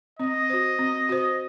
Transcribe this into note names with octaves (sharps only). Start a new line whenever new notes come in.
C4 D#5
F#4 C5
C4
F#4 C5